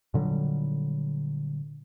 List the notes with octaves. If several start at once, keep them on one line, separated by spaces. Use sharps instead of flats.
A#2 D3 F#3 G3